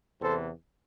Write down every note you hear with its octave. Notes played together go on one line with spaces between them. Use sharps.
E2 C3 E3 A4 C5